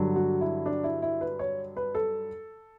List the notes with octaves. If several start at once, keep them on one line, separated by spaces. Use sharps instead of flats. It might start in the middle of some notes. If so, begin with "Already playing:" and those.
Already playing: G2 D3 F#3
F#4
E4
D4
E4
E4
B4
C#5
B4
A4